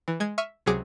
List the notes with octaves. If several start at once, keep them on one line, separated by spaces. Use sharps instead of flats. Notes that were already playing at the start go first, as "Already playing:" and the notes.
E3
G#3 G#6
E5 C#6 F6 D#7
C#2 C3 F#3 G#4 D6 D7